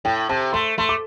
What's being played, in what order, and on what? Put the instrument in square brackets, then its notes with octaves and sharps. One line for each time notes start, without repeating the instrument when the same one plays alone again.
[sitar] A2 [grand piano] G5
[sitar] C3 [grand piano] A5
[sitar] A3 [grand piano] C6
[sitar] A3 [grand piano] C6
[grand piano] D6